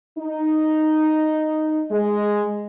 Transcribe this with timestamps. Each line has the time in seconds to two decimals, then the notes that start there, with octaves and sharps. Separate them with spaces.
0.17 D#4
1.91 G#3